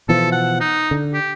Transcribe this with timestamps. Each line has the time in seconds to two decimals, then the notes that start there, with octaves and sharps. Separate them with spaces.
0.09 B2 E3 F3 A4
0.32 F#5
0.60 D#4
0.91 D3
1.14 G4